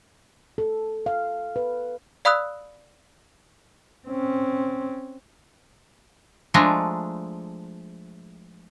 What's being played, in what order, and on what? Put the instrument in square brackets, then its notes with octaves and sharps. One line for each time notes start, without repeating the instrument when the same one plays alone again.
[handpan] A4
F5
B4
[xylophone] D5 F5 B5 D#6 E6 F#6
[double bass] C4 C#4
[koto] F3 G#3 A3 D4 A#5